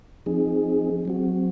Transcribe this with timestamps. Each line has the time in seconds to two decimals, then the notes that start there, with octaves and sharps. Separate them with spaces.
0.26 F3 C4 D#4 G#4
1.05 F#3 C4 F#4